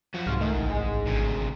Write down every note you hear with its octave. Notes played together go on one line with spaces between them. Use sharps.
F#2 F3 F#4
C2 G#2 F4
G#2 D#3 A3
A1
G#3
G#1 D2 C3